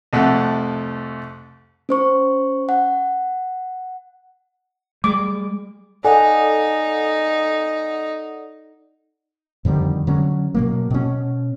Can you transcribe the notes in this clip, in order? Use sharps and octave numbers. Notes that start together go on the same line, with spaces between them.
C2 F2 A3 F#5
C#4 C5 C#6
F#5
G3 G#3 D6
D#4 A4 D5 F#5 G#5
F2 D3 D#3 G3
D3 F#3 C#4
B2 F#3 A#3
B2 C#4